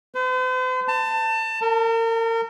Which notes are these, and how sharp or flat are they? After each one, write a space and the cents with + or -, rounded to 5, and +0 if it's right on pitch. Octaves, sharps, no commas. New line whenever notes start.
C5 -45
A5 +25
A#4 -35